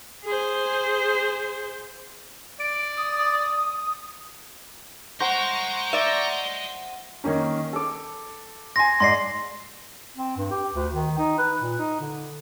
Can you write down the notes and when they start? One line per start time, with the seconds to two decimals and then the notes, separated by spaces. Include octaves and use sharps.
0.24 G#4 C5
2.60 D5 D7
2.97 D#6
5.21 C5 D#5 F#5 A#5 C6 C#6 G6
5.93 D5 E5
7.24 D#3 A#3 C#4
7.73 A4 D6
8.76 G#5 C6 A#6
9.00 G#2 D5 C6 A#6 C7
10.17 C4
10.37 G2
10.51 G4
10.74 D2
10.94 D#3
11.18 D#4
11.38 B4
11.61 A#2
11.79 D#4
12.01 D3